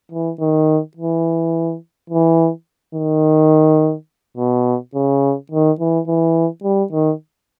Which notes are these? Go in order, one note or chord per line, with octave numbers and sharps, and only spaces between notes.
E3
D#3
E3
E3
D#3
B2
C#3
D#3
E3
E3
G3
D#3